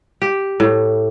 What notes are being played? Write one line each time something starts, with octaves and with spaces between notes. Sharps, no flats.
G4
A2